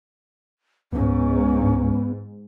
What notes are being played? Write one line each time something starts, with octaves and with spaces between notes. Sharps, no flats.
C#2 G#2 B3 C#4